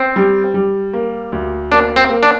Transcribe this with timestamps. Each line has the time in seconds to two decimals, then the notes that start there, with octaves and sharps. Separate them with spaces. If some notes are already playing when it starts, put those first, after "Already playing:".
Already playing: C4
0.16 G3
0.54 G3
0.93 A#3
1.32 D2
1.71 A#3 D4
1.96 C4
2.09 A#3
2.23 D4